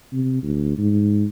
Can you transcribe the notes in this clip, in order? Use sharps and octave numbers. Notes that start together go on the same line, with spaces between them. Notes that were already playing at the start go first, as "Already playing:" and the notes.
C3
D2
G#2